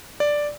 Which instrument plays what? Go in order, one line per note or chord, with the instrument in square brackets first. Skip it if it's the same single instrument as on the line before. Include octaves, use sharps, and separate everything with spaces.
[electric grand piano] D5